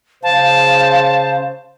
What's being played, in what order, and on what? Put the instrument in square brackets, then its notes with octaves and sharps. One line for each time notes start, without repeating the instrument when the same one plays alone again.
[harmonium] C#3 C5 [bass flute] F5 [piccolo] A5